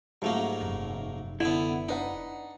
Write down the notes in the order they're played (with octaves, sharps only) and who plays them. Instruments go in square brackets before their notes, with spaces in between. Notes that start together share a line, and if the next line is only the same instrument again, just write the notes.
[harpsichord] G#2 F#3 A#3 [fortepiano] G3 A3 F4
[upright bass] F1 F#2
[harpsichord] D3 B3 [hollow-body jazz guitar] E4
[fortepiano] D4 B4 F#5 [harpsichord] D#4